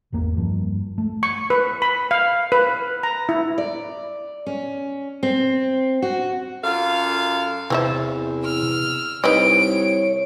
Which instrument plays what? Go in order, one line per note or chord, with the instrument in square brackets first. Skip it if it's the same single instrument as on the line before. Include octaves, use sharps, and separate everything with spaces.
[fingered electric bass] G#1 E2 A#3
G2 F3
A3
[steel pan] C#6
B4
B5
F5
B4
A#5
E4
[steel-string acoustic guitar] D5
C#4
C4
F#4
[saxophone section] F#2 F4 A4 F5
[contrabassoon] E2 [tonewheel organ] C3 [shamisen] E3 F3 E5
[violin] E6 F6
[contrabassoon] C2 [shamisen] D#4 B4 D#5 [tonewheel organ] C#5 [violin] D7